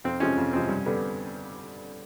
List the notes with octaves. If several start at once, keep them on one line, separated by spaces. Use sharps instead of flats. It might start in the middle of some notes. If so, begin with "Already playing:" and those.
F2 C4
C3 F3 G#3 C4 C#4
F2
C3 F3 G#3 C4
G2
D3 G3 B3